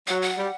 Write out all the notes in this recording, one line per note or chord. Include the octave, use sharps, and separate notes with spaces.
F#3 F#5
F#5
G3